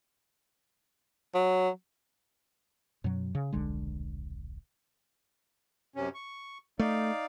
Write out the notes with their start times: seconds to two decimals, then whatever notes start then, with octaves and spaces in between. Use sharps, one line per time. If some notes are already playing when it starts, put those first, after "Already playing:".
1.35 F#3
3.04 F#2 B2 F#3
3.35 C#3
3.53 D#1 B1 D3 G#3
5.96 F#2 C3 C#4
6.15 C#6
6.79 A3 D#4 D5 F5